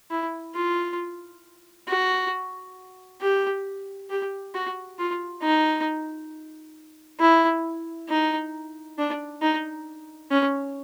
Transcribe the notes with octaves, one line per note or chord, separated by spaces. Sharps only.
E4
F4
F#4
G4
G4
F#4
F4
D#4
E4
D#4
D4
D#4
C#4